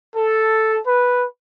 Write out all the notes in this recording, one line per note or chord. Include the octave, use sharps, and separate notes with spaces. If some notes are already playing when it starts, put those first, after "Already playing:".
A4
B4